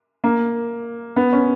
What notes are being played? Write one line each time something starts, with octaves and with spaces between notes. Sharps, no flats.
A#3
B3
C#4